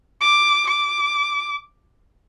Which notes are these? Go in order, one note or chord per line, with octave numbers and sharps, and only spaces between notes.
D6
D6